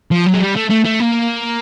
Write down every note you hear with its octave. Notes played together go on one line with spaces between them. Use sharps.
F3
F#3
G#3
G3
A3
A3
A3
A#3